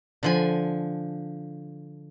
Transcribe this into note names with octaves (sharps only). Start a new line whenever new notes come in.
D3 F3 G#5